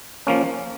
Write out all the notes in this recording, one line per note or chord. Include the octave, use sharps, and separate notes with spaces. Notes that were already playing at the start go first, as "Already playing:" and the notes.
F3 A#3 C#4